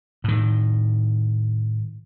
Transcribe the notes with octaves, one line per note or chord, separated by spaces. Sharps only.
A2 D#3